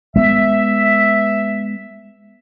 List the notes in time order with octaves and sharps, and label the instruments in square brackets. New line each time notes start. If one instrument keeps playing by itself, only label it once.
[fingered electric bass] G#3 B3 [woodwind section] E5